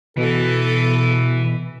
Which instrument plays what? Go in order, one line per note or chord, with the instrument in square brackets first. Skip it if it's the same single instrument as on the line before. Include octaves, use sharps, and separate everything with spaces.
[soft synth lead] B2 [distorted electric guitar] E3 [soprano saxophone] A4